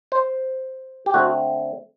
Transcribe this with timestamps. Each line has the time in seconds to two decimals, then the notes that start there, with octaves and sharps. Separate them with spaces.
0.12 C5
1.06 G4
1.14 D3 A3 C4 F#4